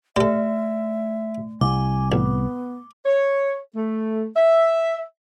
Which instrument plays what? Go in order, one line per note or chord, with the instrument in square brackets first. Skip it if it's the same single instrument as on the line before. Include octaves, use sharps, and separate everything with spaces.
[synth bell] A3 [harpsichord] G4 A4 [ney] E5
[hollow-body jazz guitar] C2 [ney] G#5 [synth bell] D6
[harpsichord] A1 [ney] B3
[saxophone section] C#5
A3
E5